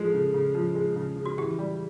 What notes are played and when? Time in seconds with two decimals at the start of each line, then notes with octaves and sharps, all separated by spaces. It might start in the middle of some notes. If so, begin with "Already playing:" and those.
Already playing: F3 G#3 A4
0.14 C#3
0.34 C#3
0.55 F3
0.75 G#3
0.96 C#3
1.16 C#3
1.26 F#4
1.38 E3 G4
1.59 G3